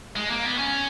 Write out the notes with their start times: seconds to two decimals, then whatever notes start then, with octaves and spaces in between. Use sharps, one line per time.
0.16 G#3
0.30 A#3
0.44 B3
0.58 C#4